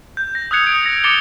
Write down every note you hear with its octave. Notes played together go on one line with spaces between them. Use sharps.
G6
A#6
D#6 E6 F#6 G#6 C#7 F7
D#6 D7
A#6
D6 A6 C#7 G7